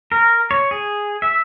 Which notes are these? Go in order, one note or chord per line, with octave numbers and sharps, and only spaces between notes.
A#4
C#5
G#4
E5